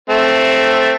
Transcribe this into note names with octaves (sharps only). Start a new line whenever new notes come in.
A3 C4